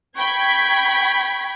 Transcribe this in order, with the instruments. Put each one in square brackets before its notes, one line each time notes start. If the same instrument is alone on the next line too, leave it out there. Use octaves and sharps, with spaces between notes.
[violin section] G5 B5 C#6 G#6 B6